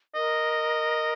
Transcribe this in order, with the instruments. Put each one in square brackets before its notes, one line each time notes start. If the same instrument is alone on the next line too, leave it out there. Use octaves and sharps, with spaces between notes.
[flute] A#4 [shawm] D#5